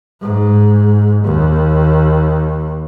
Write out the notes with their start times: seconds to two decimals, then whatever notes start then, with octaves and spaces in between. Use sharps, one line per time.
0.22 G#2
1.24 D#2